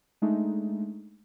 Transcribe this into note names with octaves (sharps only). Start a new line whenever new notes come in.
G#3 A3 D4 D#4